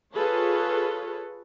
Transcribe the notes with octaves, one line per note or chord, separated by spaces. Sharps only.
F4 G#4 A4 B4 C#5